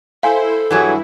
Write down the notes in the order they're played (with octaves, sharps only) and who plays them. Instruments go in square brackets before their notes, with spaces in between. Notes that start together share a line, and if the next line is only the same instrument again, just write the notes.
[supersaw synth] E4 C5 [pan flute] A4 [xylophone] F5 G#5
[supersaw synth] G2 E4 [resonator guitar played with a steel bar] E3 F#3 G#4